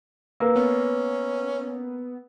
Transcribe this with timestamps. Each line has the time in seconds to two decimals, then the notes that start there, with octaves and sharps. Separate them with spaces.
0.40 A#3 B4 E6
0.56 B3 C#4